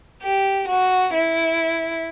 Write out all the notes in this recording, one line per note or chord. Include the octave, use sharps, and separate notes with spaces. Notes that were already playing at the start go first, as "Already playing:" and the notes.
G4
F#4
E4